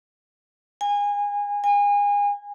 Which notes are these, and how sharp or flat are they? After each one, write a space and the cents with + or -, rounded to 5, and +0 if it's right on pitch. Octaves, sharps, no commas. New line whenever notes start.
G#5 -25
G#5 -30